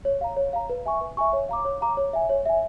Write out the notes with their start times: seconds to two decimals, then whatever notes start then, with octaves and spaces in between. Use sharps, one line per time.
0.05 C#5
0.21 F5 A#5
0.36 C#5
0.53 F5 A#5
0.70 B4
0.86 E5 G#5 C#6
1.01 B4
1.17 E5 G#5 C#6
1.33 C#5
1.49 F5 A#5 D6
1.65 C#5
1.81 F5 A#5 D6
1.97 C#5
2.13 E5 G#5
2.30 C#5
2.45 E5 G#5